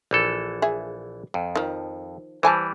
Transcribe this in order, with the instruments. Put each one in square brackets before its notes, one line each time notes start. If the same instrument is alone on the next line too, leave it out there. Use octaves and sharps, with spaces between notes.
[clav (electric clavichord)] A#1 E3 A4
[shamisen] G#4 E5
[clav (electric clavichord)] F2
[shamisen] D#3 F3
[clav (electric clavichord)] E3 G3 [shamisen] C5 G#5 A5